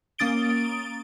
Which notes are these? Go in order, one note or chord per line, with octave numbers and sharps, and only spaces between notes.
A#3 C#4 D#6 A6 D7 G7